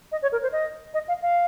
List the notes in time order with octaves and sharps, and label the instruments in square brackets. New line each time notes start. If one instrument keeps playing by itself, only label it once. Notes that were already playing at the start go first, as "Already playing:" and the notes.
[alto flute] D#5
C#5
A#4
C5
D#5
D#5
F5
F5